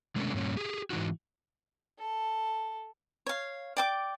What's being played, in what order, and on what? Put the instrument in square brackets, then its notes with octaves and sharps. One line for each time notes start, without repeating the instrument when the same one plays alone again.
[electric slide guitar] C3 G#3 A3 B3 C#4 D4
G2 A#2 C#4
G4 G#4
G#2 E3 D#4 F#4
[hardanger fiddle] A4
[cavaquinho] C#5 F5
D5 G5 D6